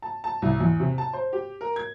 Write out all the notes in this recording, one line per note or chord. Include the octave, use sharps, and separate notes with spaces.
A5
A5
C2
E2
C3
A5
C5
G4
A#4
G#6